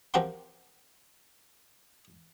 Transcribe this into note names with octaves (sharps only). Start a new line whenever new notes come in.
F3 C4 G4 A#4 F#5 C6